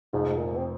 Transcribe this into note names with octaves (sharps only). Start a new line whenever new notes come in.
F1 F2 G#2 F3
A#2
C4